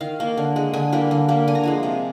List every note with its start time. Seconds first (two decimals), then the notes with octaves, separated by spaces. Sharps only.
0.01 D#3 F5
0.20 A#3
0.37 D3
0.56 G#3
0.73 D3 G#5
0.92 G3 A#3
1.11 D3
1.28 G3 A#3
1.48 D3 G#5
1.55 A#5
1.63 F3 G#3 G#5
1.83 C3